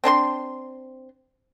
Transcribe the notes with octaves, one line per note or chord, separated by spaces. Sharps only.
C4 D4 C#5 C6